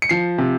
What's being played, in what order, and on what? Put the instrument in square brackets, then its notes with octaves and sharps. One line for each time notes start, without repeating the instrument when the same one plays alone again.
[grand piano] C#7
F3 C7
C3